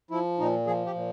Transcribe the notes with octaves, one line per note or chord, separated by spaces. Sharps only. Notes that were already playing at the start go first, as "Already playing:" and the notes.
F3 E4
A#2 D#4
F3 G#4
G4
A#2